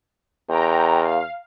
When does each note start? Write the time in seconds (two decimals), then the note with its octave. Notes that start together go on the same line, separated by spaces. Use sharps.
0.50 E2 G5 A#5
1.02 F5